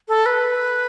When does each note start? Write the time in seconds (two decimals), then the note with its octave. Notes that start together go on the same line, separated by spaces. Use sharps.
0.08 A4
0.26 B4